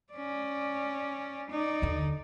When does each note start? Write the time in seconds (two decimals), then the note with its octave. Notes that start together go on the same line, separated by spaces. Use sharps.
0.13 C#4 D5
1.50 D#4 D5
1.82 D#2 D3